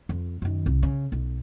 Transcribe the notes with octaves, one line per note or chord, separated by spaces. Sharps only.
F2
F#2 D#3
C2
C#3
B1